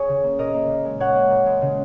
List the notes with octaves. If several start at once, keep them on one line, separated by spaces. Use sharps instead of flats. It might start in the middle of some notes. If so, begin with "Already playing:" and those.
Already playing: G#4 C#5
C#3
A#3
A#2 A#4 D#5
A#3
A#2
G#3
A#2 C#5 F#5
A#3
A#2
G#3
C#3